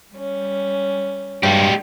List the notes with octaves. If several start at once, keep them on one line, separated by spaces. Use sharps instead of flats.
G3 C#4
G2 G#3 G4